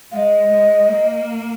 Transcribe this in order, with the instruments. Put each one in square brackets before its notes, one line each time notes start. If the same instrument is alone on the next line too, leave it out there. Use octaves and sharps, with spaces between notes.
[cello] G#3 [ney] F5
[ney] D#5
[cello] G#3
A#3